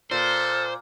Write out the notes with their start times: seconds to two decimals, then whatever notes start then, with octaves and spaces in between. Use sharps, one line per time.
0.11 A#2 A4 C5